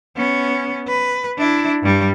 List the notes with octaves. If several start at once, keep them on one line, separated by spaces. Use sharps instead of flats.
B3 C#4
B4
D4 E4
G2 G3